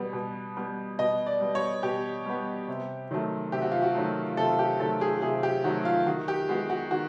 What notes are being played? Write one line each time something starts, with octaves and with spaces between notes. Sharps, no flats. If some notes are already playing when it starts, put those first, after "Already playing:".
Already playing: B2 G3 B3
B2
G3 B3
B2 D#5
D5
G3 B3
C#5
B2 G4
G3 B3
C3
D#3 F#3 A3
C3 G4
F#4
F4
F#4
D#3 F#3 A3
C3 A4
G4
D#3 F#3 A3 A4
G#4
C3 G#4
G4
D#3 F#3 A3 F#4
F4
D#3 F#4
G4
G#3 B3 F#4
F#4
D#3 F#4